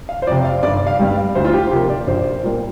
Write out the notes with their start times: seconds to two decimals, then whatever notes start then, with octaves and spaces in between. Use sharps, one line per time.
0.09 F5
0.22 C5
0.27 F2 D5
0.32 C3
0.45 F5
0.63 G1 D5
0.87 F5
0.99 G2 G3
1.35 D2 C5
1.45 F4
1.53 G4
1.71 C3 F3 A#3 G4
1.90 D5
2.07 A#1 C5
2.43 A#2 G3 A#3